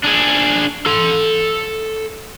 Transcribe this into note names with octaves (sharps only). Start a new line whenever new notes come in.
D4 G#4
A4 C6